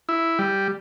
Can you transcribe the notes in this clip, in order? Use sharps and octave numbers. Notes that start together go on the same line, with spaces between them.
E4
G3